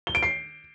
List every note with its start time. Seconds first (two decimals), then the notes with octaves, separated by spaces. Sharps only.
0.07 G7
0.15 D7
0.23 C7